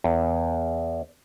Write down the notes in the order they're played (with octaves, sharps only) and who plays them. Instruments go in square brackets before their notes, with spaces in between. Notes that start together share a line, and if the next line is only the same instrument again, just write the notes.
[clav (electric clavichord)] E2